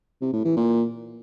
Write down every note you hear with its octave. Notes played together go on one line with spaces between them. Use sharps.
C3
A2
E3
A#2